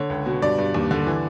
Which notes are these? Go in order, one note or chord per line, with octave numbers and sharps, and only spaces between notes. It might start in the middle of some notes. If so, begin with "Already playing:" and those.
Already playing: D3 C#5
C#2
B2
G2 D5
G2
D#2
D3
E3